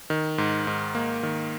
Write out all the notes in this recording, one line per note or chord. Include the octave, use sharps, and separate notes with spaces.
D#3
G#2
G#2
A#3
D#3